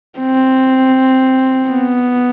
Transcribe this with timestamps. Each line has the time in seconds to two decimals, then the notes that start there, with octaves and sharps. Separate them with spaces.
0.19 C4
1.69 B3